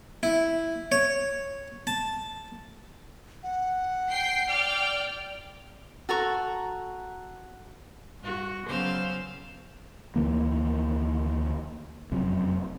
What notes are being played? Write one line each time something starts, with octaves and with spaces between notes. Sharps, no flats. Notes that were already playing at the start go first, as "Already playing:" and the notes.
E4
C#5
A5
F#5
G5 C7
D5 G5 F6
F#4 A4 A#5 C#6
G2 F#4
C#3 F#3 B3 C5 F5 E6
D2 D#3 E3 A#3
F1 F#2 C3